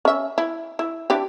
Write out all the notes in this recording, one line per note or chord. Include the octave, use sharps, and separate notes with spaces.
C#4 E5
E4
E4
D4 E4 G4